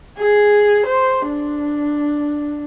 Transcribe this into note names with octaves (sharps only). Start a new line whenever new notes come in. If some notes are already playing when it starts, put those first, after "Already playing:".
G#4
C5
D4